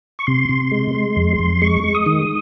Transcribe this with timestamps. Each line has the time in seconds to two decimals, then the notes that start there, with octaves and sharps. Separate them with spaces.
0.19 C#6
0.27 C3 C6
0.49 C3
0.72 G#3
0.95 G#3
1.16 F2
1.39 F2
1.62 G#3 C#6
1.84 G#3
1.95 D#6
2.06 D#3